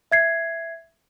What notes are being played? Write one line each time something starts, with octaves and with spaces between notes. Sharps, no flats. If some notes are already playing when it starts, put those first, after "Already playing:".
E5 G#6 C7